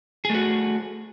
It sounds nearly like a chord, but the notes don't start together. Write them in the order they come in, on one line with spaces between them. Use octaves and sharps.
G#4 A3 F#4